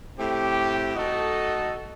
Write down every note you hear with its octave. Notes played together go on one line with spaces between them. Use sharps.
A2 A3 C4 G4
A3 D#4 F#4 A4 D#5